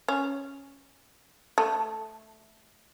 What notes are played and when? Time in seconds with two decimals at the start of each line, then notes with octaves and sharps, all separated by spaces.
0.08 C#4
1.58 A3